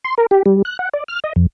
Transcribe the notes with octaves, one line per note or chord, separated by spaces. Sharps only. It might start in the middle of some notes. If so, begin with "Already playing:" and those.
C6
A#4
G4
G3
F#6
F#5
D5
F6
D#5
F2